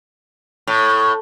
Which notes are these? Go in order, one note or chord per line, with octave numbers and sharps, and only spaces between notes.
A2